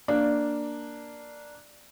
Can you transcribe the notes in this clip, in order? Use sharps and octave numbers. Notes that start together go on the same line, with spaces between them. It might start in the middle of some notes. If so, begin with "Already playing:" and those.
A#3 D4